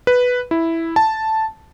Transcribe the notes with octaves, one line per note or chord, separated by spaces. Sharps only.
B4
E4
A5